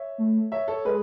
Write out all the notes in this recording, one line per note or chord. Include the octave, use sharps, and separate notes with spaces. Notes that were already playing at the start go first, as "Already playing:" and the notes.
Already playing: C#5 E5
A3
C#5 E5
A4 C#5
G#3 G#4 B4